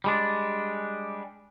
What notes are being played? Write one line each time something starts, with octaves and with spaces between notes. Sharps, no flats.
G3 G#3 D4